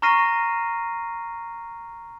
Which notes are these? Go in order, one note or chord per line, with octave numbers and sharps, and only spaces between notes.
A#5 C#6 F6 A#6 C7 D#7